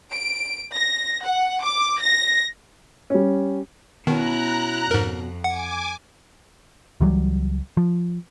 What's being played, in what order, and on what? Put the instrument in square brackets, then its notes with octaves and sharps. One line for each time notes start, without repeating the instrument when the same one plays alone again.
[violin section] D7
A#6
F#5
D6
A#6
[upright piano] G3 C#4
[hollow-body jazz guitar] B2 C#4 [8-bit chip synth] D#3 [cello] E4 [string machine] A#5 F#6
[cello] F2 [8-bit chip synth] G#2 A#4
[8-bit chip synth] F#5 [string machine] G#5 D6
[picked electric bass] C#2 E3 F#3 G3
F3